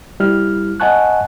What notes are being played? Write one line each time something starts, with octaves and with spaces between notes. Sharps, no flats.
G3 E4 F6
D#5 F#5 G#5 A5 C#6 F#6